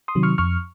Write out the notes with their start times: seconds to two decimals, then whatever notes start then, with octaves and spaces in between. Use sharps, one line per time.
0.08 C6 D#6
0.15 C3 D#3 F#3
0.23 C#6 F6
0.38 F2 C#6 F6